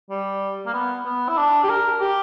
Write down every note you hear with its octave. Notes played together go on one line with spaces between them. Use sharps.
G3
A#3
B3
B3
E4
D4
G4
A#4
G4